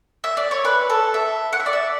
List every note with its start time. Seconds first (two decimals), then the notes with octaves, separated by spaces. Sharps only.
0.24 E5
0.37 D5
0.51 C#5
0.65 B4
0.90 A4
1.14 E5
1.53 F#5
1.60 E5
1.66 D5
1.73 E5